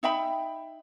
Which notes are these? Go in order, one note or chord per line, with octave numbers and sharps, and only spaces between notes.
D#4 E5 G5 B5